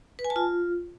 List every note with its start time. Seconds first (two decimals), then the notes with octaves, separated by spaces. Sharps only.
0.19 B4
0.25 G#5
0.30 A5
0.36 F4